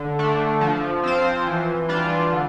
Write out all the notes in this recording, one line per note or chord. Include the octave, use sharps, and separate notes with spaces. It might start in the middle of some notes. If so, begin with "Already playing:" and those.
Already playing: D3
A3 D4
F3
C4 F4 C5
E3
G3 D4 F4
D3